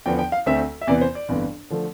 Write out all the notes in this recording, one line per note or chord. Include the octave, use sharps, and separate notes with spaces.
E2 D3 F3 B3 G5
G5
F5
D2 D3 A3 C4 E5
E5
E2 C3 E3 B3 D5
C5
D5
G1 F2 E3 B3
D3 F3 A3